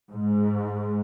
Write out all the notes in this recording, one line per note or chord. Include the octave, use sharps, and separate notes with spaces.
G#2